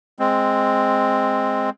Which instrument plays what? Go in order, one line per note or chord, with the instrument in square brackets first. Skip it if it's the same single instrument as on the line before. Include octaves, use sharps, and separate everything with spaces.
[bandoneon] G#3 C4